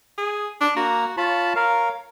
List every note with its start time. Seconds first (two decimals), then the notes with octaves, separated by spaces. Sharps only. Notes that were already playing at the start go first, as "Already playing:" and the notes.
0.18 G#4
0.61 D4
0.76 A#3 F#4 A#5
1.17 F4 C#5 A5 B5
1.56 A#4 F5